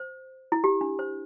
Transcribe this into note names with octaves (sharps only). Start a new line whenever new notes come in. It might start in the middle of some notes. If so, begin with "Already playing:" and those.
Already playing: C5
E4
G4
D4
C5